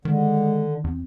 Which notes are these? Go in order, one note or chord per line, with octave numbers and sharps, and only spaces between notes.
D3 D#3 G#3
E2 C4